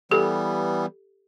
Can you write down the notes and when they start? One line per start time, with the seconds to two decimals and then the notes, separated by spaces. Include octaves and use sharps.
0.11 E3 G3 B3 G4 A4